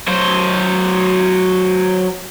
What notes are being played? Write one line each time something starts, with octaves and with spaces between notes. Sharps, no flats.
F#3 C5